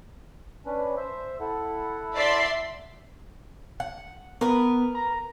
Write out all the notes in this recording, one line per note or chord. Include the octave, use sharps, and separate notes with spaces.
C#4 D4 B4
C5 E5
E4 A4 F#5
D5 E5 C6
F#5
B3 A#4 B4
A#5